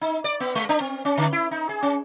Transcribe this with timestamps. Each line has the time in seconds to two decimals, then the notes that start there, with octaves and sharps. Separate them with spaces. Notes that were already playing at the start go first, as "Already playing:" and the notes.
0.01 D#4
0.24 D5
0.40 B3
0.55 G#3
0.69 D4
0.80 C4
1.05 C#4
1.17 D3
1.32 E4
1.51 D#4
1.69 G#4
1.83 C#4